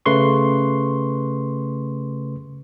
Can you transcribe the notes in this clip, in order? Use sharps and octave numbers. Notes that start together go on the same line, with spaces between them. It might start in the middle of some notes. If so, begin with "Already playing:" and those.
C#3 A3 B4 C6 C#6